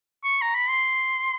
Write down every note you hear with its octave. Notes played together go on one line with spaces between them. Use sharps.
C#6
A#5
B5
C6